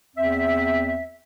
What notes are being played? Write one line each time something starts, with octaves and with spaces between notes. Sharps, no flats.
E2 C4 E5